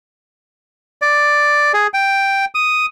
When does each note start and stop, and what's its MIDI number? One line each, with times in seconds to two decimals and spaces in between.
1.02 1.72 74
1.74 1.87 68
1.94 2.45 79
2.55 2.86 87